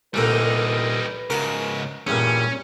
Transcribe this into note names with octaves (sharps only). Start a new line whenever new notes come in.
C2 A#2 D3 G3 D#4 B4
G#2 C#3 F#4 A#4
E2 G2 A#2 C#4